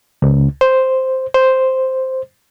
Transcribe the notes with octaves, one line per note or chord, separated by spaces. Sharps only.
C#2
C5
C5